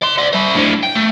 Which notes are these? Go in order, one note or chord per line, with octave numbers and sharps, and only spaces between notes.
D5 C6
D5 E5
E4 C5
A2 D3
G5
A3